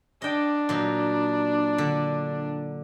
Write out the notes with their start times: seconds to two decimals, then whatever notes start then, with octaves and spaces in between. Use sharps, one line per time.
0.22 D4 D#5 G5
0.69 A#2 F#3 D#4
1.78 D3